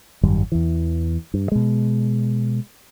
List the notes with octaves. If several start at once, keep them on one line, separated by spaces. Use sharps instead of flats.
G#1 F#2 D#3 G3
E2 E3
G2
B2 G#3